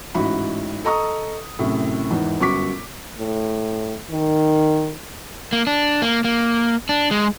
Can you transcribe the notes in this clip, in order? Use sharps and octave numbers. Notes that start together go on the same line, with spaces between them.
A1 G#2 E4 F#4 B5
A4 D#5 A#5 C#6 D#6
F#2 A2 C3
E2 G#2 D#3 E3
G1 F#2 F#4 C#6 D6 B6
A2
D#3
A#3
D4
A#3
A#3
D4
G#3